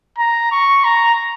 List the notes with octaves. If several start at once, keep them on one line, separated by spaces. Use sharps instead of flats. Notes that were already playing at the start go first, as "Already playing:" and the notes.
A#5
C#6
A#5